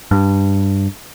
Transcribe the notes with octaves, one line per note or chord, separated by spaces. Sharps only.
G2